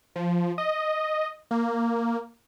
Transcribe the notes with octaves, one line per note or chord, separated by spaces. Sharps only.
F3
D#5
A#3